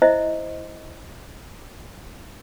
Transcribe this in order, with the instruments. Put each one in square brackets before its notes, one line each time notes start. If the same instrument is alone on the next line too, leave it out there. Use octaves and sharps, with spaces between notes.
[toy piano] E4 C5 D#5 E5